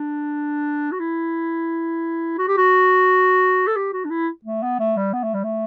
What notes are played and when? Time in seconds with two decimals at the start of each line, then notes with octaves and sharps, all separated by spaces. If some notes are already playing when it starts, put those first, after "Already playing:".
Already playing: D4
0.92 F#4
1.00 E4
2.38 F#4
2.48 G4
2.57 F#4
3.68 A4
3.77 G4
3.93 F#4
4.05 D4
4.10 E4
4.45 A3
4.63 B3
4.79 A3
4.97 G3
5.13 B3
5.24 A3
5.34 G3
5.44 A3